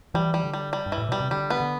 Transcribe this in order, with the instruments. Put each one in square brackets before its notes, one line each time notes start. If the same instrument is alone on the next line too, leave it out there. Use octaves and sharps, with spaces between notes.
[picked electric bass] E3 [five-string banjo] G3
[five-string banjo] G3
[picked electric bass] D3
[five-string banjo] G3
G3
[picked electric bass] G2
[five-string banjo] E3
[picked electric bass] A2
[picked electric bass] B2 [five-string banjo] G3
[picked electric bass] C3
[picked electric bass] D3 [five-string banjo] G3
[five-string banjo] B3
[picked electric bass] D3